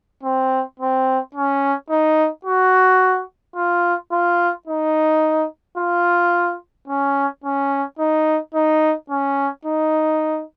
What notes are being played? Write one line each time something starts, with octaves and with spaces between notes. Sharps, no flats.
C4
C4
C#4
D#4
F#4
F4
F4
D#4
F4
C#4
C#4
D#4
D#4
C#4
D#4